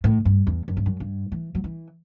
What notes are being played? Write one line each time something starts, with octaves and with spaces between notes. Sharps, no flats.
A2
G2
E2
F#2
G2
F#2
G2
E3
F#3
E3